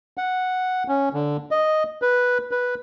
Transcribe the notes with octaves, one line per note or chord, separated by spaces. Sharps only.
F#5
C#4
D3
D#5
B4
B4